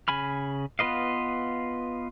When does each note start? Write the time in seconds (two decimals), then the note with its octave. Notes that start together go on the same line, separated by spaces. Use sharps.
0.08 C#3 G#5 B5 F6
0.79 B3 F4 B4 D#5 F5